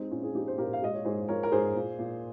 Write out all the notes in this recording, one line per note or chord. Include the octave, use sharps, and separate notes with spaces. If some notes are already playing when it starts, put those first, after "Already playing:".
Already playing: G#3 C4 D#4
A#2 C#4 F4
G#4
F3 D#4 G4
C5
A#2 G4 A#4
F5
G#3 D#5
C#5
G#2 G#4 C5
F3 A#4 C#5
A#4
G#2 G#4 C5
A#2
A#2